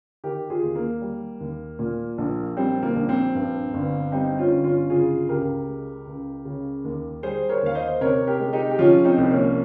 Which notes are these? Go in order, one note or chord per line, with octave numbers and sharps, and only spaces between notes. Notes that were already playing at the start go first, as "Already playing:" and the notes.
D#3 G4 A#4
F4 G#4
D#2
A#3
G3
D#2
A#2
A#1
G3 C4
A#3
A#1
C4
G2
G1
G3 C4 D#4
C#4 F4
G1
C#4 F4
C#3 F4 G#4
C#2 G4 A#4
G#3
C#2
C#3
D#2
G3 G#4 C5
A#4 C#5
D#2 F5
C5 D#5
C3 A#4 C#5
G4 A#4
G#3
D#4 G4
G4
F3 C#4 F4
C4 D#4
C2
A#3 C#4